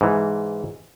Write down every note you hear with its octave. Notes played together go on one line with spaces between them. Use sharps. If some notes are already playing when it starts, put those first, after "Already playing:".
G#2 E3